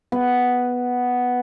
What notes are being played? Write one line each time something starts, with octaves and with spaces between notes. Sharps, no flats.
B3